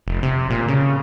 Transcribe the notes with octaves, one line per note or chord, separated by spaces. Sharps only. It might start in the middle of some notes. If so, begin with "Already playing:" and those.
F1
C3
A#2
C#3